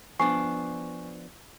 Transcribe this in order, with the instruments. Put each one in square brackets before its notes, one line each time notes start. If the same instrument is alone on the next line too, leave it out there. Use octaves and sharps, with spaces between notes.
[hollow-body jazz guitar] F3 B3 D4 [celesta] G#5 C#6 C7